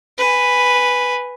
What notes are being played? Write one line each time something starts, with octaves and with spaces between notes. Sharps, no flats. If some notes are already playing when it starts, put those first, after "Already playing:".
B4 G#5